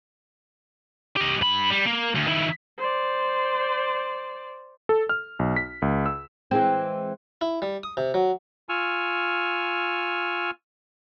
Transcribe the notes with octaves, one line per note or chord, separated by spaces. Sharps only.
G4 D#5
G2 B5
G3
A#3
D2
D#3 E4
C5 D5
A4
F6
B1
B6
C#2
E6
E3 G#3 C4
E4
G3
D#6
C3
F#3
F4 G#5 C#6 E6 F6